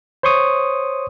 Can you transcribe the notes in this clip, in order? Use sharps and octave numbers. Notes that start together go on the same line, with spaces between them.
C5 C#5 C6 C#6 D#6